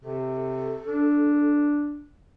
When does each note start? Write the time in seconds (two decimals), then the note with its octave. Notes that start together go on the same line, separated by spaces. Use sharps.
0.04 C3 A4
0.87 D4